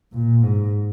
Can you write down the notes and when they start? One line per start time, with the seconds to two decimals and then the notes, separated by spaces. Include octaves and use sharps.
0.12 A#2
0.43 G#2